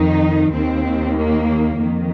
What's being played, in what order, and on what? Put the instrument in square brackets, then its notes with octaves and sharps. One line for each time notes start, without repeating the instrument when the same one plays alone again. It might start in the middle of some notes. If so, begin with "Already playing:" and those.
Already playing: [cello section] F2 D#3 D#4
D#2 D#3 C4
A#3
F2 D#3